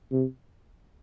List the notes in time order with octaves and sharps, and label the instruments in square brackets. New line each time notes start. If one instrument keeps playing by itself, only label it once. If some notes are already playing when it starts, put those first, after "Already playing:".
[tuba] C3